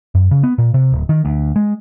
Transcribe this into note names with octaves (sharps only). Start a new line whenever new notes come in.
F#2
C#3
B3
A#2
C3
D1
D#3
D2
G#3